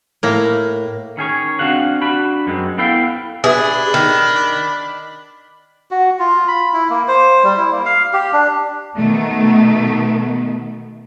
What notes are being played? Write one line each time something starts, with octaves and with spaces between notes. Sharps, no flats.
A2 A#3
D#3 C#4 G#4 C#5
C4 D4 F#4 F5 F#5
D4 F#4 B5
F#2 G#3 C4
B3 E4 A4 B4 F5 G5
D4 G4 G#4 B4 E5 B5
D#3
F#4
F4
B5
E4
A#3
C5
G3
E4
A#3
F5
G4
D4
B2 D#3 A3 B3